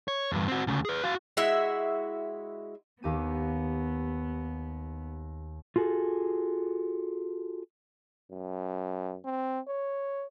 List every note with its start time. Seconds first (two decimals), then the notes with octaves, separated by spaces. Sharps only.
0.08 C#5
0.32 E2 G2
0.48 C4 F#4
0.67 D2 C#3
0.85 G#4 B4
1.04 F#4 F5
1.37 G#3 E4 F#4 E5
3.03 D#2 B3 G4 D#7
5.76 F4 F#4 G#4 A4
8.31 F#2
9.25 C4
9.68 C#5